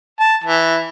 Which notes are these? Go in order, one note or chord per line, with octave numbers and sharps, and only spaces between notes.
A5
E3